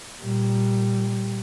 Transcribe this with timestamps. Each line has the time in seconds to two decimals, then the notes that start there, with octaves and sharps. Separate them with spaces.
0.21 A#2 G3